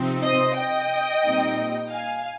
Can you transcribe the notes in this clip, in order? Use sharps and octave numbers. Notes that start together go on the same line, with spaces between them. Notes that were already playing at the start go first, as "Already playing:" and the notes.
Already playing: C3 F3 C4 D#4
C5 D#5
D#5 G5
A#2 G3 C4 D#4
F5 G#5